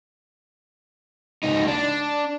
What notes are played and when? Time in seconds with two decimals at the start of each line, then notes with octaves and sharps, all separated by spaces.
1.43 C#2 D#4
1.67 D4